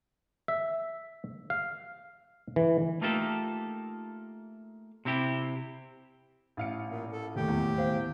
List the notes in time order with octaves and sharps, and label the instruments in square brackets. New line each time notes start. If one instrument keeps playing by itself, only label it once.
[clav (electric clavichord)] E5
F5
E3
[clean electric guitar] A3 A#3 D#4 F4 G4 A4
C3 C4 E4 G4
[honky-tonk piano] A1 F5 C#7
[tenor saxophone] A#2
A4
[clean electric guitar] D#2 A2 C3 [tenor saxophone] G4
[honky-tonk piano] E2
[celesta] C5 F5